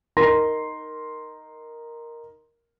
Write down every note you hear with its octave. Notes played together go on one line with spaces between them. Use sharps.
D#4 A#4 C6 A#6